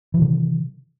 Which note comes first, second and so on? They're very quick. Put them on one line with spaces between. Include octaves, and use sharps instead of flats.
E3 F#3 D#3 C3